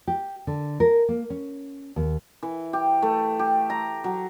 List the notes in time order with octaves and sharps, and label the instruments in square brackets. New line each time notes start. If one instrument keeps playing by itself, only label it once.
[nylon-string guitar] G4
D3
A#4
A#3
C#4
D#2
[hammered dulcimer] E3
G4
A3
G4
A#5
F#3